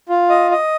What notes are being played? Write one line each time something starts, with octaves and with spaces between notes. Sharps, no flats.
F4
D#5
D#5